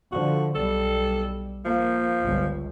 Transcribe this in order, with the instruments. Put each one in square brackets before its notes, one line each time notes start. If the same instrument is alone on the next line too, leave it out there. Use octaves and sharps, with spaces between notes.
[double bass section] D3 F3 [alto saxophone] F#4
[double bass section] B1 G3 [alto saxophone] A4
[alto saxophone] F3 [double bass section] A#3
[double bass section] G1 C#2